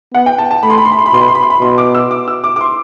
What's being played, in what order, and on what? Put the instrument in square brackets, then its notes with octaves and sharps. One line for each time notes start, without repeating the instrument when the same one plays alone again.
[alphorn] B3 [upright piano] F#5
[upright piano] G5
A5
A5
[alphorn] A3 [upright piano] B5
[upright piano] C6
B5
C6
B5
C6
B5
[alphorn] B2 [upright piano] C6
[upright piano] B5
C6
B5
C6
B5
[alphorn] B2 [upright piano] C6
[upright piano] D6
E6
D6
E6
D6
D6
C6